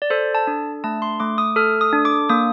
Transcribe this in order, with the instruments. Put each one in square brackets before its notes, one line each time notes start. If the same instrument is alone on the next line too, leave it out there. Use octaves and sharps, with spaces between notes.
[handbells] D5
A4 C5
A5
D4
A3 A5
C6
A3 D6
D#6
A4 F6
D#6
D4
D6
A#3 D#6